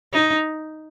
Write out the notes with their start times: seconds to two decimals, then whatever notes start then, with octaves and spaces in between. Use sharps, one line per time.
0.13 D#4